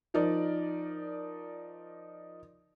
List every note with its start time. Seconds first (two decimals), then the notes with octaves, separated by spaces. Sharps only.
0.14 F3 D#4 A#4 D5